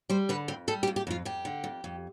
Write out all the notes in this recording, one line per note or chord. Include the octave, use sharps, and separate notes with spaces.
G3 C5
D3 B4
F2 C4
G3 A4
G4
F2
G4
F2 F4
F2 G4
D3
F2
F2